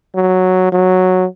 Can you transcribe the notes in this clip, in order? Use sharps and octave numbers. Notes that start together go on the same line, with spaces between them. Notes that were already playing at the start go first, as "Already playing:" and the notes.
F#3
F#3